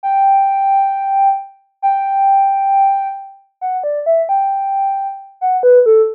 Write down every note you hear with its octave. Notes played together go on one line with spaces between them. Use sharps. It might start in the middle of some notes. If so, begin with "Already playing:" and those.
G5
G5
F#5
D5
E5
G5
F#5
B4
A4